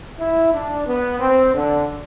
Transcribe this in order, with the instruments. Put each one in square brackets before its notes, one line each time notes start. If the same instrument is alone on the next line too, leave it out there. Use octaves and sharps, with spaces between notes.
[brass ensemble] E4
D4
B3
C4
D3